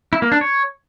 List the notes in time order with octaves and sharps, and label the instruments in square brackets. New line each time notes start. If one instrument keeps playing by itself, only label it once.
[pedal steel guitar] E4
A#3
D4
C#5